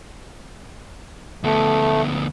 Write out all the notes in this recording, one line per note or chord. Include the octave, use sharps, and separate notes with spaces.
D2 A3 B3